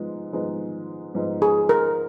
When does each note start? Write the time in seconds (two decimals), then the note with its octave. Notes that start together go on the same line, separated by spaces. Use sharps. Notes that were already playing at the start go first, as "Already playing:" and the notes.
Already playing: G#2 F3 G#3 B3 D#4
0.33 G#2 F3 G#3 B3 D#4
1.15 G#2 F3 G#3 B3 D#4
1.42 G#4
1.69 A#4